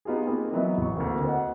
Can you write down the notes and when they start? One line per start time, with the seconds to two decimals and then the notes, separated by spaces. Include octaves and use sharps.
0.05 B3 D#4 F4 G4 G#4
0.26 A#3 C4 D#4 G#4
0.52 E3 F#3 B3 D#5 E5
0.78 A1 C#6
0.96 D2 A#3 C4
1.25 C5 D#5 F#5